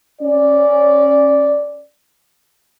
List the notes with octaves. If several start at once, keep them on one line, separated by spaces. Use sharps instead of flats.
C#4 D5